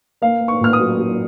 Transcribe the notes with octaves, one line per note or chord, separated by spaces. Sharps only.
A#3 F5
A#3
C#6
A#2 F6
D#6
F#3
F#3